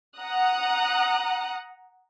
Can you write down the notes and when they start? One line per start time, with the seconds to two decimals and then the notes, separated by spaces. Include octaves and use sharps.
0.18 F#5 A#5 D#6 F#6